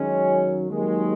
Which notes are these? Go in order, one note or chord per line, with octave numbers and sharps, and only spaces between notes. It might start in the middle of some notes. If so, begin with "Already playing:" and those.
Already playing: F#2 D#3 F#3 G#3 C#4
D#2 D#3 F#3 G#3